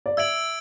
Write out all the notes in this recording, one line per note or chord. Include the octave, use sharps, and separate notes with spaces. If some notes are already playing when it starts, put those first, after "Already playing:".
D5
E5 E6 G#6 D7 F#7